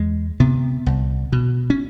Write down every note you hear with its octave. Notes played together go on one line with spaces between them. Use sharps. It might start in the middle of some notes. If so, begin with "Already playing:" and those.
Already playing: E2 G#3
C3 B3
C2
B2
C#4